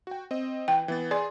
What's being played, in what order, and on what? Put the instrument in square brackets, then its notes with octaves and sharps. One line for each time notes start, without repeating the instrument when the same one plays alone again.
[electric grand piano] F#4 G5
C4 D#5
[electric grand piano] E3 [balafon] G5
[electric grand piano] E3 B3 A6
[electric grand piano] G#4 G#5 C6 [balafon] D5